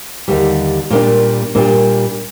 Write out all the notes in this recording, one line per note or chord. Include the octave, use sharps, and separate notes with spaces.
D#2 D3 G3
A#2 G3 A#3 D4
A#2 G3 A#3 D4